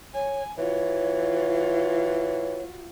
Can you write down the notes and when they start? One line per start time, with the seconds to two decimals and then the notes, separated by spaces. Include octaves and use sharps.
0.15 C#5 G#5
0.58 E3 F4 F#4 C#5